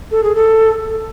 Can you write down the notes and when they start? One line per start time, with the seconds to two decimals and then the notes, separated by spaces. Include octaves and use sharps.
0.11 A4
0.23 G#4
0.35 A4